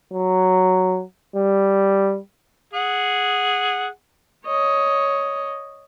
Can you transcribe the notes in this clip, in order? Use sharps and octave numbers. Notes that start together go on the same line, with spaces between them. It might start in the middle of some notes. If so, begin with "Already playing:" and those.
F#3
G3
G#4 F#5
C#5 D#5